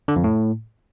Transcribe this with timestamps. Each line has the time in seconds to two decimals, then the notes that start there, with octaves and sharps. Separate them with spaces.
0.08 D3
0.16 F2
0.24 A2